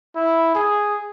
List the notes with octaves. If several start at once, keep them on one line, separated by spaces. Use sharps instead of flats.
E4
G#4